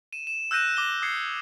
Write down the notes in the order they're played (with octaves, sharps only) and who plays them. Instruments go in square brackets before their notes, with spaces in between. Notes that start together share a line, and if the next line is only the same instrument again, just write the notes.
[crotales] D#7 E7
E7
E6 F#6 G6 A#6 D#7 E7
D6 F#6 A#6 G7
D#6 G#6 C7 C#7